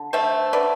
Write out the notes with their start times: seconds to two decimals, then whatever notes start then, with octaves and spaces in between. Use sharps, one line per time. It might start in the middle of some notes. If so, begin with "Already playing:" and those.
Already playing: D3
0.13 A3 C5 E5
0.53 D3 B4 D5